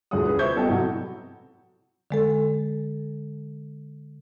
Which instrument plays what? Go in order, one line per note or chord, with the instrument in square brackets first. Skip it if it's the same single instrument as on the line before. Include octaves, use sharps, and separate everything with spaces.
[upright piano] E1 D2 G#4 C#5 F#5 D#6
C#4 G#4 B4
B4 C5 E5 C#6 G6 G#6
G3 B3 A4 D#5 G5
A2 C3 F#3 F#4
[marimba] D3 G#3 A4